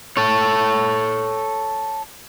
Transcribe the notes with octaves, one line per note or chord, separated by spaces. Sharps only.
A4 C#5